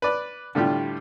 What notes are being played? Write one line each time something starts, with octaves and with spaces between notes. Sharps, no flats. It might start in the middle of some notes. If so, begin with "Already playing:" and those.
B4 D5
A2 D3 G3 F4 G4